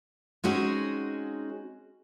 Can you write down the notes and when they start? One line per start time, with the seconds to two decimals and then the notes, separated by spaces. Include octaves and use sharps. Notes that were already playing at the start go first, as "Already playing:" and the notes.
0.44 G#3 C4 C#4 D#4 F#4 G#4